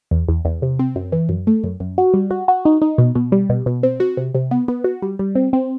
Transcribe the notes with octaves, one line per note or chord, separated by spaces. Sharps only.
E2
E2
E2
C3
C4
F#2
E3
F#2
A3
F#2
F#2
F#4
G3
F#4
F#4
D#4
D#4
B2
B2
G3
B2
B2
C4
F#4
C3
C3
B3
B3
F#4
G3
G3
C4
C4